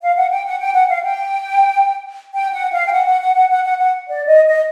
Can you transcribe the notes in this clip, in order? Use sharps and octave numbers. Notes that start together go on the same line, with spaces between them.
F5
F#5
G5
F#5
G5
F#5
F5
G5
G5
F#5
F5
G5
F#5
F#5
F#5
F#5
F#5
F#5
F#5
D5
D#5
D#5